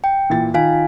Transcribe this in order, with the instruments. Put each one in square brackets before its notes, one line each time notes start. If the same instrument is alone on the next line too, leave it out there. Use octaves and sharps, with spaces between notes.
[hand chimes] G5
[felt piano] A#2 E3 A6
[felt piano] D#3 [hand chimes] F4 F5 G#5